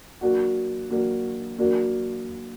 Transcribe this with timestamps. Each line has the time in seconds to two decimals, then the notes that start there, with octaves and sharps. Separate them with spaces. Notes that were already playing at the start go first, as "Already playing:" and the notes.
0.21 F#3 A#3 D4 F#4
0.90 F#3 A#3 D4 F#4
1.58 F#3 A#3 D4 F#4 A#4